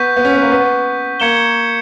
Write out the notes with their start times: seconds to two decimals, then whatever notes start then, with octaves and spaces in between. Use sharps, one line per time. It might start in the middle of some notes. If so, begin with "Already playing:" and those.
Already playing: B3 C#6 G6 B6
0.17 B3
0.25 C#4
0.34 B3
0.42 A#3
0.52 B3
1.20 A#3 G#6 C#7 E7 G7